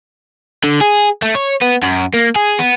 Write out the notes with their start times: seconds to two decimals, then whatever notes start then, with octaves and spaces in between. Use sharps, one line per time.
0.64 D3
0.81 G#4
1.22 A3
1.35 C#5
1.62 B3
1.83 F#2
2.14 A#3
2.36 G#4
2.59 B3